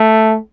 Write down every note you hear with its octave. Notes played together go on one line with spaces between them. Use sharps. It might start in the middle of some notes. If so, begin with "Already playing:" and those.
Already playing: A3